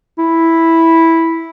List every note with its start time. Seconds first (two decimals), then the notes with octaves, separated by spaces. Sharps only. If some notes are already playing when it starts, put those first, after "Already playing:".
0.19 E4